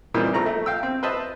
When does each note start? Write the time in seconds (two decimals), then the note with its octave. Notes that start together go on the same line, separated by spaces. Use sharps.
0.14 A#2 E3 G3 A#3 C4 D#4
0.33 G#1 F3 A3 A#5 C#6
0.46 A3
0.66 F5 G5 E6
0.83 C4
1.03 B4 C5 D#5 E5 A5